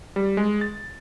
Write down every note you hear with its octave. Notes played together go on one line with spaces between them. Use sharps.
G3
G#3
A6